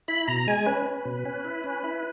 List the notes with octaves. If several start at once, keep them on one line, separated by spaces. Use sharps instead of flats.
E4 B5
B2 A#5
G#3 G#5
C#4 B4
C#4
B2
C#4
E4
C#4
E4